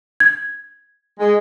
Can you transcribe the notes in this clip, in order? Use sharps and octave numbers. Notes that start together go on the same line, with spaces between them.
G#6
G#3